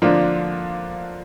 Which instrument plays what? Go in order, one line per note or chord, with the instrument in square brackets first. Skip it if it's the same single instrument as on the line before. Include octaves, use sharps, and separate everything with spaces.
[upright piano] D3 F3 A#3 D4 F4